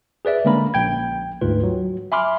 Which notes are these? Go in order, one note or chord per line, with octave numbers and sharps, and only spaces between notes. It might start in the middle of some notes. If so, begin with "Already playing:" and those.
G#4 B4 D5 E5
D3 G#3 A#3 C#4 A#4 B5
A#1 G5 G#6
D2 G#2 F4 B4
F#3
E5 G#5 B5 C6 D6 F6